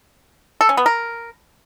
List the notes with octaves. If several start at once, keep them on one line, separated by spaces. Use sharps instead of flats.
A4
C#4
B3
A#4